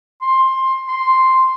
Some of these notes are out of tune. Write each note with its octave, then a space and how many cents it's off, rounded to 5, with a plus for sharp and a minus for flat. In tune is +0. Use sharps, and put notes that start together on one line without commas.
C6 +15
C6 +0